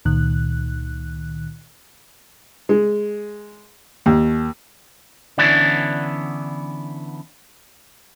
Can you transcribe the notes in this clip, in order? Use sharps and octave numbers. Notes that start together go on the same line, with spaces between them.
C#2 A#2 D#3 F#6
G#3
D#2
D3 E3 B3 C#4 D4 E4